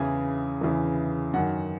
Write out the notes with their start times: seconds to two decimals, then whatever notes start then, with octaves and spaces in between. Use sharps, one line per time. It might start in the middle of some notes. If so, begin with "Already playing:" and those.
Already playing: E2 C#3 E3 G#5
0.61 E2 C#3 E3
1.33 F#2 D#3 F#5